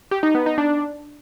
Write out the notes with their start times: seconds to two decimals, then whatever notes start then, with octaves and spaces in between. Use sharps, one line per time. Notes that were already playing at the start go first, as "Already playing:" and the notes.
0.11 G4
0.23 D#4
0.35 B3
0.46 D#4
0.58 D4